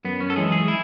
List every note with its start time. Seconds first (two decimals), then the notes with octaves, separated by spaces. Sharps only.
0.05 F#2 B3
0.20 C#4
0.30 A4
0.36 E3 G#3 G#4
0.52 G#4
0.68 E4